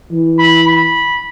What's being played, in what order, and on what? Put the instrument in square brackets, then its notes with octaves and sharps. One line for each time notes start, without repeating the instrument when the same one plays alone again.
[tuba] E3
[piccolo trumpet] B5
B5